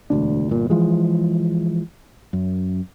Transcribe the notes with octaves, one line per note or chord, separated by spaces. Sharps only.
E1 D2 D4
G1 A#2
E3 F3 G#3
F#2